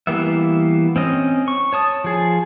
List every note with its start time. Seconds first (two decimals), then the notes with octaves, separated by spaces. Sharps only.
0.07 E3 G3 A#3 B3 E5
0.96 C4 C#4 D#5
1.48 C#6
1.73 C#5 A5 D#6
2.04 F3 G#4